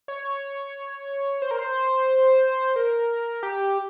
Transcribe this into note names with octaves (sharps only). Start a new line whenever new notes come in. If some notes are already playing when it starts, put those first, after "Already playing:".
C#5
C5
A#4
C5
A#4
G4